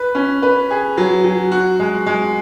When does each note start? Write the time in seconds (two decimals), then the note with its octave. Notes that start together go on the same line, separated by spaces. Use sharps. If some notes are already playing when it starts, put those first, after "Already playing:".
Already playing: B4
0.15 C#4
0.42 B4
0.71 G#4
0.97 F#3
1.24 F#3
1.51 F#4
1.79 G#3
2.06 G#3